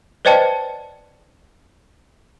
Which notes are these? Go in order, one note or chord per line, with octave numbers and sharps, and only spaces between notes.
B4 C5 D5 D#5 G5 A5